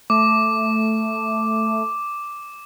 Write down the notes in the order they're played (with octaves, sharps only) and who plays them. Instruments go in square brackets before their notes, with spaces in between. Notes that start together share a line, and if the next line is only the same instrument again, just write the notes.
[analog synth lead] A3 [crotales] D6